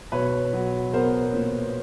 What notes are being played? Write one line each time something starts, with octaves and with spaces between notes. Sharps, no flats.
B1 B4 C#5
F#3
B3 A#4 C5
A#2